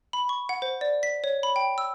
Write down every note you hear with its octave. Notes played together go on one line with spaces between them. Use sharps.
B5
C#6
F#5
C5
D5
B6
C#5
B5
G5
E6